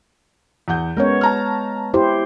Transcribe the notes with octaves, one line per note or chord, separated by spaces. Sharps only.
E2 F#5 G6
G#3 B3 C#4 A#4 C#5
A5 A#5 F6
E4 G4 C5